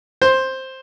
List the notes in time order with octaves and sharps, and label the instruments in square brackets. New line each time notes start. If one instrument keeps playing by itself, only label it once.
[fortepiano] C5